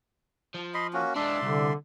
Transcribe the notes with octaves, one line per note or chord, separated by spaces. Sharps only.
F3
D#5 B5 C6
A#3 C#4 F#4
G#3 D4 D5 E5 C6
C2 D3